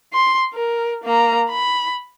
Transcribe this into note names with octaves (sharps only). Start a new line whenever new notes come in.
C6
A#4
A#3 A#5
B5